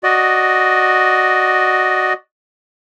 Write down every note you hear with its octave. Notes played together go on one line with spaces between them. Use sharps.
F#4 D5 D#5